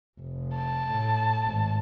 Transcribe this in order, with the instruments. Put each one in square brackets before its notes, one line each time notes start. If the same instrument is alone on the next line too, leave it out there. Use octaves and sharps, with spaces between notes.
[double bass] F1
[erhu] A5
[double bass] A2
G#1